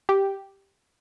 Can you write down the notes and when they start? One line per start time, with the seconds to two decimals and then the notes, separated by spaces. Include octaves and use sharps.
0.09 G4